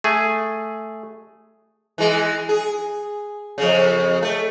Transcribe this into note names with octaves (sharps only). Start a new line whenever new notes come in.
A3 G#4
E3 G#3
G#4
F2 C#3
A3